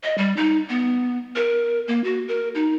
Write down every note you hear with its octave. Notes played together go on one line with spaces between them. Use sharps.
D#5
G3
D#4
B3
A#4
A#3
F#4
A#4
D#4